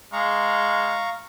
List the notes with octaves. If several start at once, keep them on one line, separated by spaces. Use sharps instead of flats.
G#3 F5 A#5 C#6